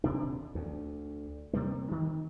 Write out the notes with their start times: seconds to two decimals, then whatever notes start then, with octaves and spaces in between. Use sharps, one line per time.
0.04 D#1 C3 D4
0.55 D2
1.53 C3 G3 A#3
1.91 D#3